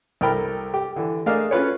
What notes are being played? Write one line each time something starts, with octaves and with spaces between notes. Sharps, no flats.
C2 A4 A#4 G5 B5
G4
D3 E3
A3 D4 G#4 A#4 D#5 F5
C#4 F4 B4 C#5